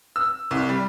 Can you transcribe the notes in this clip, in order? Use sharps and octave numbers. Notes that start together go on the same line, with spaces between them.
E6
C2
G3